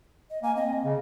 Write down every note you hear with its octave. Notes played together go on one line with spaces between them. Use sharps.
D#5
A#3 G#5
C4 D#5
C#3